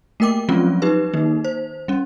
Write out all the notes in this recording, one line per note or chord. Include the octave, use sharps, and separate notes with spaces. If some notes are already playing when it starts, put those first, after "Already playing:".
A3 A#3 A#4 G5 D6
F3 F#3 G#3 C4 C#4 F4
D#4 G4 B4
D#3 A#3 D#4
C5
G3 C#4